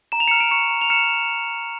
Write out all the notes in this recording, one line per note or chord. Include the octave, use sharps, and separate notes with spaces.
A#5 E7
F7
F6 C#7 E7
D7
C#6 C#7 E7
A#5
F7
F6 C#7 E7